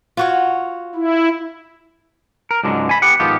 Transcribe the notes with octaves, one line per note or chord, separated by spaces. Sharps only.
F4 F#4 C#5
E4
A#4
C#2 G#2 D3 F#3 G#3
G#5 B5
B3 G4 F#5
G#2 D#3 F3 B3 F4 G4